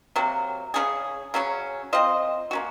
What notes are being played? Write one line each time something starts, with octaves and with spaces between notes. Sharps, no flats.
C3 F#3 A#3
C#3 F#3 C#4 G#4
C#3 F#3 C#4
C4 F4 C5 D#5
A#3 C#4 F#4